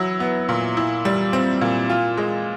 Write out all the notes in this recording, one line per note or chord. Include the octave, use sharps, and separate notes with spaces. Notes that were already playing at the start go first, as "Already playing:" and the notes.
Already playing: F#3 E4
B3
A#2
E4
G3
C4
A#2
F4
G#3